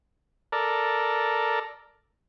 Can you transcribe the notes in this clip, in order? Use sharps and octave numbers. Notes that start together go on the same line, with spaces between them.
A4 A#4 D5